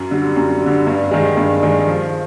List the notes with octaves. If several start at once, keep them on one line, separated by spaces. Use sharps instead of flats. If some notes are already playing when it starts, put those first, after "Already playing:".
Already playing: F#2
D3 G3
F#2
D3 G3
G2
D#3 G#3
G2
D#3 G#3
F3